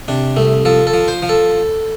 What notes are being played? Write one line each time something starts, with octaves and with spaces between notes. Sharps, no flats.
C3 D4
C2 A3
F3 A4
A4
F3
C5
F3
A4